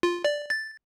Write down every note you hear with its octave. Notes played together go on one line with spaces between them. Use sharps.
F4
D5
A6